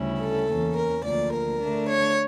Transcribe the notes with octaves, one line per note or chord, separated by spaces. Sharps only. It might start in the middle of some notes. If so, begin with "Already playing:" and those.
Already playing: D2 C#3 G3 C#4 E4
A4
E2 E3 A#3 C#4
A#4
D2 D3 F3 A#3 D5
A#4
D3 A3 D4
C#5